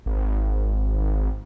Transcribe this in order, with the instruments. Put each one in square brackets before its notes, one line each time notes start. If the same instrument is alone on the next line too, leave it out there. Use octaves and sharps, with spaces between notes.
[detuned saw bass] G#1